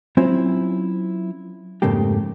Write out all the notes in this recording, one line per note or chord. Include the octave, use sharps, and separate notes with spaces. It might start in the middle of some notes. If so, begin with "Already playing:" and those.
F#3 C4 C#4 E4 F4 C5
F2 G#2 C#3 A3 A#3 G4